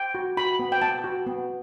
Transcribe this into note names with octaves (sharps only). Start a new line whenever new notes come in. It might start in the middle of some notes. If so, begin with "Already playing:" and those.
Already playing: G5
F#4
F#4 B5
B3
G5
B3 A5
F#4
B3